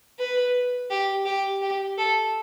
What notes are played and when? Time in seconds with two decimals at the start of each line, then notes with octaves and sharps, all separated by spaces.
0.19 B4
0.90 G4
1.25 G4
1.61 G4
1.98 A4